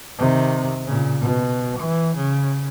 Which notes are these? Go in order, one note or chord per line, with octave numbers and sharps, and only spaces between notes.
C3 D#3
A#2 C#3
B2
E3
C#3